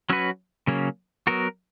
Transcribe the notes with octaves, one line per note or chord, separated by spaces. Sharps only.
F#3 C#4 F#4 B4
C#3 F#3 A#3 C#4
F#3 B3 F#4 A#4